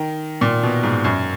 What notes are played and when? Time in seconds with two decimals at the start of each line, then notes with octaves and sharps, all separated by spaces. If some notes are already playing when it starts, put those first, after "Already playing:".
Already playing: D#3
0.41 A#2
0.63 B2
0.83 G#2
1.04 F#2